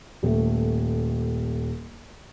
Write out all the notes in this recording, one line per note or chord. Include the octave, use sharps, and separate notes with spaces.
D#1 A3